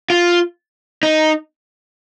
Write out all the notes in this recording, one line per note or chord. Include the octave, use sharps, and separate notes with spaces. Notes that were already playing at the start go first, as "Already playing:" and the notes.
F4
D#4